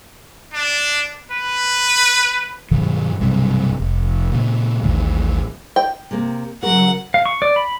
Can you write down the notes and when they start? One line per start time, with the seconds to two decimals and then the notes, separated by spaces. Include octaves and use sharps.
0.54 D4
1.32 B4
2.71 G2 B2 D#3 F#3
3.20 B1 G2 C3
3.80 F1
4.32 A#2 C#3
4.83 A1 D#2 A2
5.76 G5
6.11 C3 A#3
6.63 C#3 F#3 F#4 A#4 F#5
7.14 F5
7.26 C#6
7.42 D5
7.56 B5